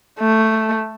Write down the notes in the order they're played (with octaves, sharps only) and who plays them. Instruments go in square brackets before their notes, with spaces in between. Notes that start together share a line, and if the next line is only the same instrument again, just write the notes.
[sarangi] A3